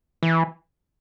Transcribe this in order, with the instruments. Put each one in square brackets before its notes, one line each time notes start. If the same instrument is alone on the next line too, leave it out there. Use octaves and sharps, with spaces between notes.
[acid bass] E3